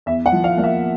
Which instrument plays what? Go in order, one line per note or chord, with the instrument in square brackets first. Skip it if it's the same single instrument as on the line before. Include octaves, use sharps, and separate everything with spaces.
[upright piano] E2 E5
F#5
F3
F5
A#3 F5
E5